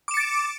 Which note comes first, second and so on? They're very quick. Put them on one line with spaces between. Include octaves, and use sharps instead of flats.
D6 E7 C#7 A6 D7